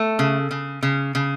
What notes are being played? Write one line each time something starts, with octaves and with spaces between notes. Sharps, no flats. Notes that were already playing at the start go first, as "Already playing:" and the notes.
Already playing: A3
C#3
C#3
C#3
C#3